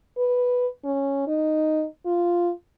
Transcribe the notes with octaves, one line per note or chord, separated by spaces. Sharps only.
B4
C#4
D#4
F4